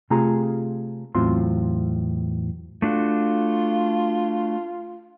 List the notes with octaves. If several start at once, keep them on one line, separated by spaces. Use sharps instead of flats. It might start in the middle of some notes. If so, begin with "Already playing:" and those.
C3 A3 F4 G#4 A#5
E2 A2 F#3 C4 F4 C6
A3 D4 F4 F#4